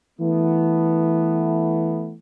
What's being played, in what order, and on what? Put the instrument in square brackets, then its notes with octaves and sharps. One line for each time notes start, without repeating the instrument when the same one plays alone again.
[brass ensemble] E3 A3 B3